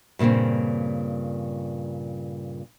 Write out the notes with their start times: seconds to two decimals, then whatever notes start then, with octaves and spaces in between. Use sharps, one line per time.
0.19 G2 A#2 C#3 A#3 C4